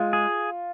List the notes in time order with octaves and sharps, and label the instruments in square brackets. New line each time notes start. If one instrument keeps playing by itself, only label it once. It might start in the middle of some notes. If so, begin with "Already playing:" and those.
Already playing: [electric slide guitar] G#3 [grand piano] F4
[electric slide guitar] G#4